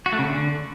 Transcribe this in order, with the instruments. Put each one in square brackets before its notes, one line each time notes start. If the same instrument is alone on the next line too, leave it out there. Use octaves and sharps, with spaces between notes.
[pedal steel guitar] F#4
A3
C#3
D3